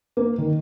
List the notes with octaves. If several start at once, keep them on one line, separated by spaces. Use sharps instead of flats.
A#3
D#3